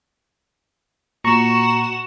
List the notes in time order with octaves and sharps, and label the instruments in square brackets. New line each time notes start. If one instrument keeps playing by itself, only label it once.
[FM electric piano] A#2 A#5 C#6 [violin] F#4 E7